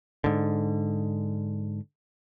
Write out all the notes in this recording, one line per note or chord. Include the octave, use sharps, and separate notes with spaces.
G#2 D3